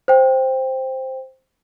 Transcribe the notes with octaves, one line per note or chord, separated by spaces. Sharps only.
C5 G5